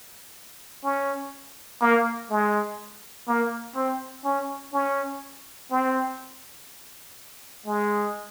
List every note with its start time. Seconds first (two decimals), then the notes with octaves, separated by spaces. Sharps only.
0.84 C#4
1.81 A#3
2.31 G#3
3.28 A#3
3.76 C4
4.25 C#4
4.73 C#4
5.71 C4
7.66 G#3